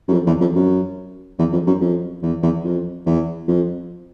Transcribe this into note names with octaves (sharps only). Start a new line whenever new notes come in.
F#2
F2
E2
F2
F#2
E2
F2
F#2
F2
E2
E2
F2
E2
F2